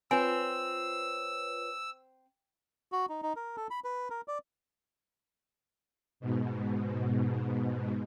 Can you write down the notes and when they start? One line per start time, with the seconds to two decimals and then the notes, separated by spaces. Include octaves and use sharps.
0.11 C4 F4 B4 C#5 G#5 E6
2.92 F#4
3.09 D#4
3.23 D#4
3.36 A#4
3.57 A4
3.70 B5
3.84 B4
4.10 A#4
4.28 D5
6.20 G#2 B2